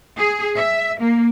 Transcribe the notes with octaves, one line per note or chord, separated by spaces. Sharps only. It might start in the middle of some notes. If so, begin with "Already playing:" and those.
G#4
E5
A#3